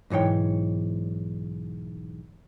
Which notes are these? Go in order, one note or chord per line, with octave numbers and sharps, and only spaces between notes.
B1 G#2 E3 C#5 G5